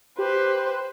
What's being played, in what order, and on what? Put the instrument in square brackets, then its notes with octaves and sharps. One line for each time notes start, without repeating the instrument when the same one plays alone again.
[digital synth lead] G4 [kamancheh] B4 C5